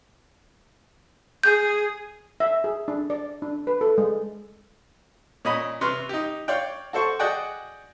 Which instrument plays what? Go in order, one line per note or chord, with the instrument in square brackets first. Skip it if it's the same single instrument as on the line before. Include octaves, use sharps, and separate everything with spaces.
[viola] G#4 [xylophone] G6
[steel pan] E5
G#4
D4
D5
D4
B4
A4
G#3
[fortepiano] A#2 C#4 D#5 B5 D#6
C3 B4 C6 F6
D#4 G4
C#5 D5 F5 G5
F#4 A4 C5 C#6
F#4 G#4 D5 D#5 F#5 G5